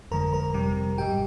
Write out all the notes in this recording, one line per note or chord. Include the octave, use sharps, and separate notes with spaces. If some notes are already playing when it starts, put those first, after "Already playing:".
G1 F2 D3 G#3 A#4 A#5
A#4 A#5
F2 C3 G3
G#1 G#2 G3 G4 G5